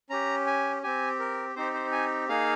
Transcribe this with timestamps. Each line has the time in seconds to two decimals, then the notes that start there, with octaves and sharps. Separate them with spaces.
0.10 C#4 G4 A#5
0.47 G#5
0.83 C4 G4 G#5
1.20 A#4
1.56 C4 D#4 G4 C5
1.74 C5
1.92 G#5
2.29 A#3 D#4 G#4 F5